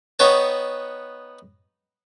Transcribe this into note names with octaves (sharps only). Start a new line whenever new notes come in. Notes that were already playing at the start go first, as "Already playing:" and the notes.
B3 D#4 F#4 C#5 G5 A5